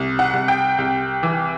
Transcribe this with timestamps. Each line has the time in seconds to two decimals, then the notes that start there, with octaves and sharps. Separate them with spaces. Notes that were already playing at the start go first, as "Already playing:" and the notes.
Already playing: C2
0.19 F#5
0.33 C2
0.48 G5
0.78 C2
1.23 E3